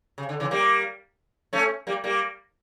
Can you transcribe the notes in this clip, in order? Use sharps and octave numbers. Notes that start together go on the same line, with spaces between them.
C#3
D3
C#3 E3
G3 A#3
A3 C#4
G3 A#3
G3 A#3